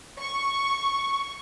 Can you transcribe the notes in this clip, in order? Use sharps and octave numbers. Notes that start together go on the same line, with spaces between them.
C#6